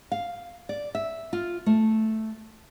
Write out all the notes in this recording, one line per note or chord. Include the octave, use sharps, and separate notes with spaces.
F5
D5
E5
F4
A3